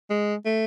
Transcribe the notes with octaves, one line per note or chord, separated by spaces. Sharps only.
G#3
A3